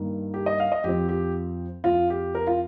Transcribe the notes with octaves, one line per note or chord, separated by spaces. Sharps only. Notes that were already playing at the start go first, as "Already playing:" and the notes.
Already playing: G2 D#3 A#3
G4
D#5
F5
D#5
F2 F3 C4 G4
G4
F2 F3 C4 F4
G4
A#4
F4